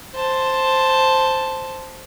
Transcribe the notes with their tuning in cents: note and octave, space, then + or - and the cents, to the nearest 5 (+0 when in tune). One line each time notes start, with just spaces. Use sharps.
C5 +0 A5 +0